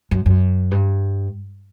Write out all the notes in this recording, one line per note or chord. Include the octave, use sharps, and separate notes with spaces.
F#2
F#2
G2